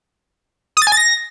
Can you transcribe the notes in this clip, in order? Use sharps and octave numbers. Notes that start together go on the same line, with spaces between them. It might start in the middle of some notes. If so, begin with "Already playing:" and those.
D#6
A6
G#5
A6
A#6